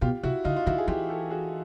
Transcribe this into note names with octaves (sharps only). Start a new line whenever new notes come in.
B2 F4 G4
C3 E4 F#4
D3 D#4 F4
F4
D#3 E4 F#4
G#4
E3 F4 G4
G4 A4
F#4 G#4